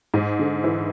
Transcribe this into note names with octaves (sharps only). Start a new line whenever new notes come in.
G#2
D3
E3